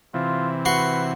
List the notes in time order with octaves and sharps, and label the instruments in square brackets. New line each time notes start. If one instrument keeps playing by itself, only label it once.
[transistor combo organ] C3 E3 [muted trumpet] F4
[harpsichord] F#4 C6 C#6 [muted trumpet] B4